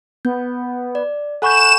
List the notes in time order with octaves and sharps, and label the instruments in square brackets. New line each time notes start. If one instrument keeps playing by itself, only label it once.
[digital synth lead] B3 [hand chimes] G6
[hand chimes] D5
[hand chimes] A4 F#5 B5 [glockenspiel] G#5 C#6 G6 [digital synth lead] F#6 [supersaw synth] E7